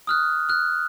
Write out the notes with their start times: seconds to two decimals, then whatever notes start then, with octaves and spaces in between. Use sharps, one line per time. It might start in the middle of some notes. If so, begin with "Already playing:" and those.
0.07 D#6 F6 F#6
0.49 F6 F#6